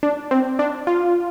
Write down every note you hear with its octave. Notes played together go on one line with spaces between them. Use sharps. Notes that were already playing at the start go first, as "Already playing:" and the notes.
D4
C4
D4
F4